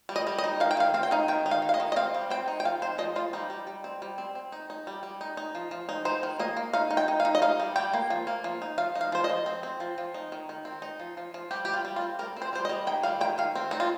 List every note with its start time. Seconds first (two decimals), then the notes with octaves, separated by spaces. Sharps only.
0.09 G3
0.16 D#5
0.27 G3
0.38 D#5
0.44 D#4
0.60 D#3 F5
0.71 G5
0.77 D#3 F5
0.94 C4 F5
1.03 G5
1.11 D#4 F5
1.28 D#3 G5
1.46 D#4
1.51 F5
1.62 D#3
1.69 F5
1.74 D#5
1.80 D#3
1.92 D#5
1.96 C4 F5
2.15 G3
2.30 C4 G5
2.48 D#4
2.60 G5
2.65 F3 F5
2.82 D#4 C5
2.98 F3 D#5
3.16 F3 F4
3.33 G3 D#4
3.50 G3
3.67 G3
3.84 C4
4.02 G3
4.18 C4
4.35 C4
4.52 D#4
4.70 D#4
4.87 G3
5.03 G3
5.21 D#4
5.37 D#4
5.55 F3
5.71 F3
5.89 D#4
6.05 D#4 C5
6.23 D#3
6.39 A#3 D#5
6.57 A#3
6.73 D#4 F5
6.91 D#4
6.97 G5
7.08 D#4
7.20 F5
7.25 D#4
7.35 D#5
7.42 D#4 F5
7.60 G3
7.76 G3 G5
7.93 A#3
8.10 F3
8.27 A#3
8.44 F3
8.62 D#4
8.78 F3 F5
8.95 D#4
9.01 F5
9.12 F3 C5
9.24 D#5
9.29 F3
9.46 C4
9.63 C4
9.80 F3
9.98 F3
10.14 D#4
10.32 D#3
10.49 D#3
10.65 C4
10.82 D#4
11.00 F3
11.17 F3
11.34 F3
11.51 G3 G4
11.65 G3 G4
11.74 F4
11.85 G3
11.96 F4
12.01 C4
12.19 G3 A#4
12.37 C4
12.42 C5
12.53 G3 C5
12.65 D#5
12.69 G3
12.87 D#3 G5
13.03 G3 F5
13.21 D#3 G5
13.38 D#3 F5
13.55 C4
13.71 C4 D#4
13.80 F4